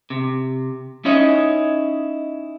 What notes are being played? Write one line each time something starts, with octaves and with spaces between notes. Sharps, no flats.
C3
C#4 D#4 E4 C#5 D#5